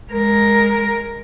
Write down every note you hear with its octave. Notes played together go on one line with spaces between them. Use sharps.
G#3 A#4